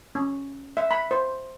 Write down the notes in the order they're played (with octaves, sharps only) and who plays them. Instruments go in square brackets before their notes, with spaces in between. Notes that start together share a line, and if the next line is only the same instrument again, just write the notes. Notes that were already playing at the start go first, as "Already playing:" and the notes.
[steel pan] C#4
E5
B5
C5